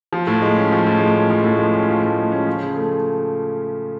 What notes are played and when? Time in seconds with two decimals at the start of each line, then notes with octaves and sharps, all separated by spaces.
0.13 F3
0.27 A2
0.42 G#3
0.57 C#4
0.72 F3
0.86 A2
1.00 G#3
1.15 C#4
1.30 F3
1.44 A2
1.59 G#3
1.74 C#4
1.89 F3
2.03 A2
2.18 G#3
2.32 C#4
2.47 F3
2.61 C#3
2.76 A3